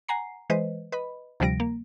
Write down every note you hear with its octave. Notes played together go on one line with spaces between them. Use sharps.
F#5 G#5 A#5 C7
E3 G#3 B4 C5 D#5
B4 D#5 B5
D2 C3 F3 G3 A#6 D7
A#3